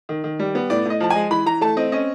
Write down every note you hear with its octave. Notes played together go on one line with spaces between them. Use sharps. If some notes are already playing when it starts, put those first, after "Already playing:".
D#3
D#3
G3
B3
A2 D5
A2 D#5
F3 A5
G#3 G#5
E3 B5
E3 A#5
A3 A5
C4 D#5
C#4 D#5